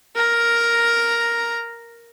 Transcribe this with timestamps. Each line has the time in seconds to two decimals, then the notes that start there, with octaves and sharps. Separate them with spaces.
0.16 A#4 A#5